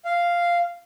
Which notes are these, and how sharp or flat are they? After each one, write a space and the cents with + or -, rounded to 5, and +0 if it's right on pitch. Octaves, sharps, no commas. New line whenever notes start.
F5 -5